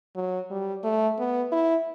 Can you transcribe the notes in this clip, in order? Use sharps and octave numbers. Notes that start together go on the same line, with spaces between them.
F#3
G3
A3
B3
E4